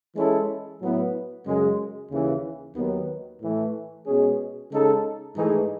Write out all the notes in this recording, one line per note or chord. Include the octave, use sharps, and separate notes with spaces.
E3 G#3 C#4 E4 A4
A2 F#3 B3 E4
F#2 C#3 G#3
D#2 C#3 E3
D#2 D#3 F#3 B3
A2 E3 A3
B2 G#3 C#4 G#4
C#3 G#3 D#4 A4
G#2 E3 A3 D#4 G#4